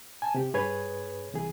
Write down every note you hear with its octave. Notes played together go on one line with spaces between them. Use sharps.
G#5 A5
C3 G4
G2 G#4 B4 C#5 G#6
C2 E3 G#4